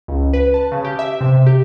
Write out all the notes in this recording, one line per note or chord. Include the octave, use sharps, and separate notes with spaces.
C#2
B4
A5
C#3
G4
E5
C3
G4